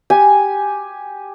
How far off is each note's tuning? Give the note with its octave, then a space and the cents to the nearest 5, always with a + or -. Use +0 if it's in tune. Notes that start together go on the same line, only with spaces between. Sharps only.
G4 +5 G#5 +0